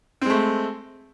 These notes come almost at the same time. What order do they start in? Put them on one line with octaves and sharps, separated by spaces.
C4 G#3 A3